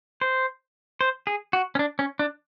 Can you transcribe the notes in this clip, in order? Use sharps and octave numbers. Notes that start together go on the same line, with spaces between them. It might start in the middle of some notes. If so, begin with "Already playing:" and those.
C5
C5
G#4
F#4
C#4
D4
C#4
D4